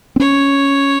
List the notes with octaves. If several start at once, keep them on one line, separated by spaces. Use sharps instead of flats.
C4
C#4 C#5